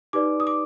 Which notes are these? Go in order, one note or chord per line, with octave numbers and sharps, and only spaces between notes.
D#4 G4 B4 D5 D6
D#6
D6